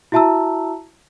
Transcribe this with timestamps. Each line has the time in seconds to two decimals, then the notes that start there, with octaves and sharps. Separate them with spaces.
0.12 E4 F#4 E5 A5 A#5 E6